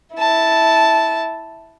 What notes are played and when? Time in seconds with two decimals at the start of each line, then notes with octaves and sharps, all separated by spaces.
0.15 E4 A5